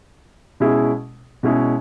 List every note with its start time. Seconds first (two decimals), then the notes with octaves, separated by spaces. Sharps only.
0.60 B2 G#3 C#4 E4 G#4
1.43 B2 G#3 C#4 E4 G#4